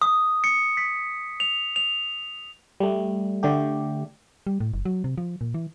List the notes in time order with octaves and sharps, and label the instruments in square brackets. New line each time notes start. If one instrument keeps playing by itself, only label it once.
[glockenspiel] D#6
C#7
B6
F7
F7
[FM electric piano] G3 A3
D3 A3 G4
[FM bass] G3
A2
F#1
F#3
C3
F3
A#2
E3